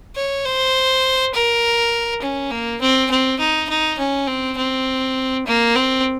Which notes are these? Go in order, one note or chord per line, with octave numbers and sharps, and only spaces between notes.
C#5
C5
A#4
C#4
A#3
C4
C4
D#4
D#4
C#4
C4
C4
A#3
C4